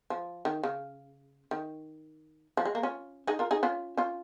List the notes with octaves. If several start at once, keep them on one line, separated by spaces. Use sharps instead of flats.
F3
D#3
C#3
D#3
F3
G#3
A#3
C#4 F4
D#4 G#4
F4 A#4
D#4 G#4
C#4 F4
C#4 F4